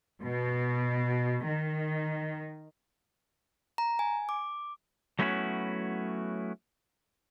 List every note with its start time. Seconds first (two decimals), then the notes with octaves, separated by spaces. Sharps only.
0.25 B2
1.46 D#3
3.78 A#5
3.99 G#5
4.29 D6
5.19 F#3 A3 B3 C#4 E4 F#4